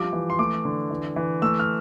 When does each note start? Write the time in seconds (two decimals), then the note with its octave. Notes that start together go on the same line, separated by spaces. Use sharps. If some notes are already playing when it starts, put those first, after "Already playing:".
Already playing: F3 G3 D6
0.13 E3
0.30 C6
0.39 A3 D6
0.65 D3
0.90 E3
1.16 E3
1.42 A3 E6
1.59 F6